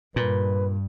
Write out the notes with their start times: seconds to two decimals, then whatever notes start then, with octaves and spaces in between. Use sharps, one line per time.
0.16 G2 A#2 B4